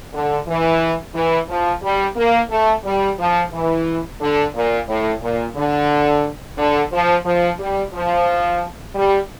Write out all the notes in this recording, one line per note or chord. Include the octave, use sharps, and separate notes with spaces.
D3
E3
E3
F3
G3
A#3
A3
G3
F3
E3
D3
A#2
A2
A#2
D3
D3
F3
F3
G3
F3
G3